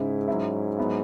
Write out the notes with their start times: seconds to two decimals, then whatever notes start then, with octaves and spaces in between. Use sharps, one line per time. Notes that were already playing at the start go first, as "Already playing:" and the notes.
Already playing: G#2 C#3 G#3 E4
0.28 F#3 C#4 E4
0.78 F#3 B3 E4